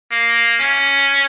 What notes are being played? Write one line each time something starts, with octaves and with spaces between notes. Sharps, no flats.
A#3
C#4